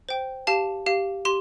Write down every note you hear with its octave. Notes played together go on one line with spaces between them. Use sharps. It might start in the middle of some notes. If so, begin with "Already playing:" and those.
C5 G5
G4 F5 A5
G4 F5
G4 C6